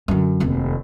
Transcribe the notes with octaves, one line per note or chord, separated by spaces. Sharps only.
F#2 D3
F1 D#2